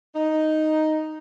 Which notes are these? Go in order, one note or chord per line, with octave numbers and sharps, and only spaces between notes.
D#4